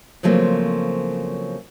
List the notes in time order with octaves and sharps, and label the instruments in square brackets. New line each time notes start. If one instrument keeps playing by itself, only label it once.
[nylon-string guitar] C#3 F3 F#3 A3 A#3 C4